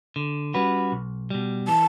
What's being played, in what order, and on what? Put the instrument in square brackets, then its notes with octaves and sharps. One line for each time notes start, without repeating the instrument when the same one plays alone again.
[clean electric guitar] D3
G3 C#4 F#4 B4
B1
B2 G3
[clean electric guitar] E3 [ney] A5